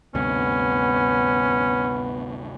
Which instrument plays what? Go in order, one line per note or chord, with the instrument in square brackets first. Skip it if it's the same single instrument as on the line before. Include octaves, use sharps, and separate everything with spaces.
[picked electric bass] D2 G2 C3 [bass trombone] B3 [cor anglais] C#4